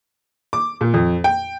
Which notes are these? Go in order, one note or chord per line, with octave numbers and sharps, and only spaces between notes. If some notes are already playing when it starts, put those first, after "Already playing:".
D6
A#2
F2
G5